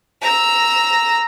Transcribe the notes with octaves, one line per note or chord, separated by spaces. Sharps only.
A#5 E6